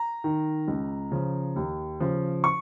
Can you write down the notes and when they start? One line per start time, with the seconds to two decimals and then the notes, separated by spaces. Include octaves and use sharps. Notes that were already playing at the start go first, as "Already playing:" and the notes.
Already playing: A#5
0.24 D#3
0.68 C#2
1.12 C#3 F3
1.56 D#2
2.00 C#3 F3
2.44 C#6